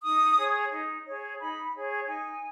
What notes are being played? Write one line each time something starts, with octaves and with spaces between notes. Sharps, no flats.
D#4 D#6
G#4 C#5
D#4
G#4 C#5
D#4 B5
G#4 C#5
D#4 G#5